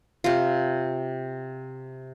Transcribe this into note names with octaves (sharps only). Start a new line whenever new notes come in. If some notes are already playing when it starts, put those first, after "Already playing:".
C3 F4